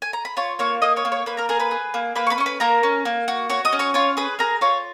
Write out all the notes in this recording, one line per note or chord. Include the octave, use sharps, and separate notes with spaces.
G#5
A#5
B5
F4 C#5 C#6
A#3 C#5 C#6
A#3 D#5 D#6
C#5 C#6
A#3
C#5 C#6
A#3 B4 B5
A#4 A#5
G#4 A#4 A#5
B4 B5
G#4
A#3
A#3 B4 B5
C#6
B4 B5
C#4 C#6
B4 B5
A#3 A#4 A#5
C#4
A#3
F#4
F#4 C#5 C#6
D#5 D#6
C#4
C#5 C#6
F4 C#5 C#6
G#4 B4 B5
G#4 A#4 A#5
F4 C#5 C#6